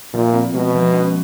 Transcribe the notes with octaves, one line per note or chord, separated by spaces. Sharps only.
A#2 F3
C4
B2 G#3
F3
C#4